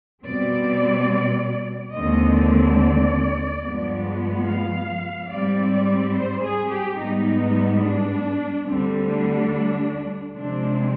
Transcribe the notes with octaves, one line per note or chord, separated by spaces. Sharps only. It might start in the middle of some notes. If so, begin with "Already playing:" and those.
B2 G3 C4 D5
D#2 D3 G#3 C4 D#5
D5
G2 F3 G#3 B3
F5
G#2 G3 C4 D5
D5
C5
G#4
G4
G#2 G3 B3 D#4
D4
D2 D3 G3 C4
D4
C3 F3 G#3 C4 D4